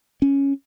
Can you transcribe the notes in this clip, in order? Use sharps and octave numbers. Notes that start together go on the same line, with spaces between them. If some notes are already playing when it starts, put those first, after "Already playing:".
C#4